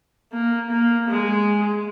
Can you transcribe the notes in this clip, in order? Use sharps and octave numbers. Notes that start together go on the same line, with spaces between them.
A#3
A#3
G#3